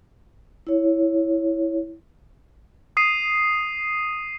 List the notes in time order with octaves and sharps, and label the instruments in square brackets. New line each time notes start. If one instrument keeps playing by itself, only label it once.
[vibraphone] E4 C#5
[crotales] D#6 C7 D#7